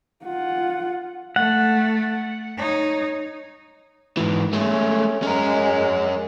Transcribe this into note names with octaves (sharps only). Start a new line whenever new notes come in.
F4 F#5
A3 F#5
D#4 C#5
G#2 E3
G#3 A3 C#4
G#3 C#4 A#4